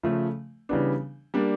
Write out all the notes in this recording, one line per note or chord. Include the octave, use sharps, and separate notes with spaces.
C#3 F3 A3
C#3 E3 G3 B3 D4
G3 A#3 D4